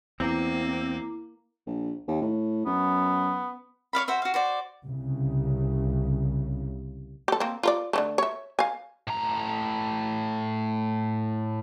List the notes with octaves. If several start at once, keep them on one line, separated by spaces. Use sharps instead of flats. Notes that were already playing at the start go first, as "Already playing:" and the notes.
E2 A#3 C4 E4 D6
A#1
D#2
A2
F#2 B3
C#5 D5 F5 B5
F#4 C5 E5 B5
F#4 F5
F#4 C5 D5
C2 C#3
G4 A4
A#3 C4
F4 A#4 D5
D3 E3 A3
C#5 E5
F5 G#5
A2 A#5